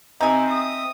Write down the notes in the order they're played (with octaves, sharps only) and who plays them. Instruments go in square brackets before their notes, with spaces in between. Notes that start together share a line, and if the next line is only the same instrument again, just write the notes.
[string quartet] C3 [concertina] C4 D#5 E5 [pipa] D#4 G#5 [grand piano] A#5
[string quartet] D#6